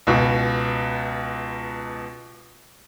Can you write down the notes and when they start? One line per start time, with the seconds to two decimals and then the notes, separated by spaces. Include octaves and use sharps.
0.07 C#2 B2